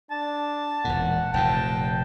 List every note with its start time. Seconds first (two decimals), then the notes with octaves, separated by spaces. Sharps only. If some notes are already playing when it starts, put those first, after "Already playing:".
0.11 D4 A5
0.84 E1 E2 A#2 F#5
1.33 F1 D#2 A#2 G5 A5